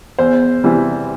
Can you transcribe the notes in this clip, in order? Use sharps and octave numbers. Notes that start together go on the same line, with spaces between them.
E2 C5
C3 E3 G3